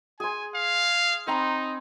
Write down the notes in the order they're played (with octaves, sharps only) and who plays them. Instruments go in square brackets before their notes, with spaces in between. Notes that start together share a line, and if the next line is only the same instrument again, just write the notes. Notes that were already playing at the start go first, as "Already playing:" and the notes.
[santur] G#4 C6 [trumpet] G#5
[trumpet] F5
[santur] C4 A#5 B5 [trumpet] D#4